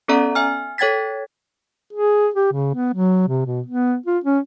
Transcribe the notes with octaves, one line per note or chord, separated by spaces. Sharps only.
B3 C#4 A4 D5 E5 A#5
E5 G#5 F6
A4 C#5 G5 G#6 A6 B6
G#4
G4
C#3
B3
F#3
C3
B2
B3
F4
C#4